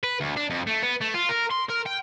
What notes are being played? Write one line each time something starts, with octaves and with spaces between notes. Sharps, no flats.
B4
D2
D4
F2
A3
B3
A3
F4
A#4
C6
A#4
G5